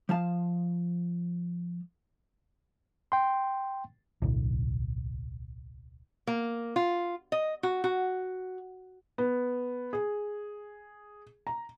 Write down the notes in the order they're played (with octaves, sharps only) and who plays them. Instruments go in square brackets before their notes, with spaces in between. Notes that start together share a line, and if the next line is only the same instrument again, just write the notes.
[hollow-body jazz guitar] F3 F5 A5
[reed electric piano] G5 C6
[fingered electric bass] D1 B1
[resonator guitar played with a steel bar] A#3
F4
D#5
F#4
F#4
[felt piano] B3
G#4
A#5